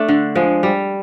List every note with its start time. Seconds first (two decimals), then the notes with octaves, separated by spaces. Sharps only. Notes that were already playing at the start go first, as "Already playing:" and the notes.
Already playing: A3 D4
0.08 D3
0.35 F3 G#3
0.63 G3